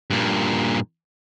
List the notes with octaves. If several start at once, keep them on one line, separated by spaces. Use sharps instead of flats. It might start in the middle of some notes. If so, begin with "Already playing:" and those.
G2 A#2